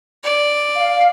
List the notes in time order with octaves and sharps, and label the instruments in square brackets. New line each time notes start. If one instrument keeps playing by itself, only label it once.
[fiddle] D5
[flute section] F5